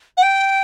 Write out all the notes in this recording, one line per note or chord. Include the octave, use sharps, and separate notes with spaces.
F#5
G5